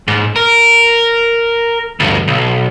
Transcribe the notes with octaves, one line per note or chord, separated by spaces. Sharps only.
G#2
A#4
D2 G2
B1